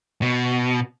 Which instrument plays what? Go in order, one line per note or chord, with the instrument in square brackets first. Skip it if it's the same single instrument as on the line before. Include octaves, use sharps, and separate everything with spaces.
[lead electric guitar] B2